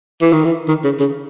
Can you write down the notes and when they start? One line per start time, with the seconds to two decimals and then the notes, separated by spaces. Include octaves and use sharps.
0.22 E3
0.33 D#3
0.44 E3
0.68 D#3
0.84 C#3
1.00 C#3